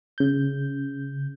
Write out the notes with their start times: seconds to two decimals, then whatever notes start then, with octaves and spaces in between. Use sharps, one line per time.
0.18 C#3 G6